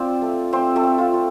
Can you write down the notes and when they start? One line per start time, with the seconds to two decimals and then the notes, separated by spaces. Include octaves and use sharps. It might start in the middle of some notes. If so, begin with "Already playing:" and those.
Already playing: C4 F4 C5 D5
0.22 A3
0.53 A3 C4 C5
0.76 A3 A4
0.83 C4
0.98 F4
1.14 A3